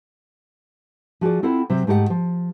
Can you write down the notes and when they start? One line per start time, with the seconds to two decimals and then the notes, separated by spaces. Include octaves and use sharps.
1.21 F3 F#4 G#4 D5
1.43 C4 E4 F4 A4 F#5
1.70 C3 F#3 C5 C#5
1.87 G#2 A3 G4 A4 F#5
2.10 F3